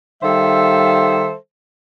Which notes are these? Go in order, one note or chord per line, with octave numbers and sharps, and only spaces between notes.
D#3 G3 A4 C5 E5 F5